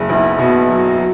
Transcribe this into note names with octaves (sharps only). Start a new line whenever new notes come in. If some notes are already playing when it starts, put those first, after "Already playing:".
Already playing: F#1
B1 E4
B2
F#3
F#3